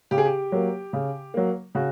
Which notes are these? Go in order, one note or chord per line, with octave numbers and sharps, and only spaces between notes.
C#3 G4
G#4
G4
F#3 A#3
C#3
F#3 A#3
C#3 F#4